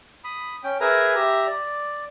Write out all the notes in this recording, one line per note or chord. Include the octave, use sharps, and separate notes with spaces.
B5 D#6
C#4 G5
G#4 A#4 B4 E5 G#5 A#5
G4 E5 A#5
D5